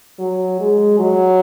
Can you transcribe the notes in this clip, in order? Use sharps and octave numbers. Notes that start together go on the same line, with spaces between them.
F#3
G#3
F#3